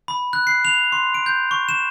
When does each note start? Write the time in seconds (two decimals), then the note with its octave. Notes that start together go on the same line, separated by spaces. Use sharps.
0.08 B5
0.33 F#6
0.47 C7
0.65 F7
0.92 C6
1.14 D7
1.26 G6
1.51 C#6
1.69 E7